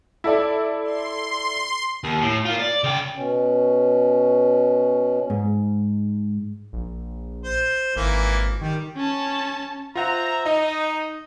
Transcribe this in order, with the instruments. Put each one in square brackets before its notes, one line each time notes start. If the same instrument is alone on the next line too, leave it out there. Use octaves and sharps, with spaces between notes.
[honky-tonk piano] E4 A4 D5
[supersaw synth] C6
[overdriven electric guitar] D#2
A2
A#3 F4
D5
C#3 G5
[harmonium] B2 C#4
[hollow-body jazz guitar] G#2
[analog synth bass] A#1
[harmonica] C5
[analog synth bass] G#1 [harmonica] E3 A#3
[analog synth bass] D#3 [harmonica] G3
[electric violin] C#4 A5
[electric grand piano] F4 F#5 [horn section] C5 E5 A#5
[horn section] D#4 [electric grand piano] D#5